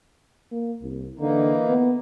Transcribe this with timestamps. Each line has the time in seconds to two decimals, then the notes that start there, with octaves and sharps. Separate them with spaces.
0.52 A#3
0.82 C2
1.19 D3 E3 A#3 D#4
1.69 B3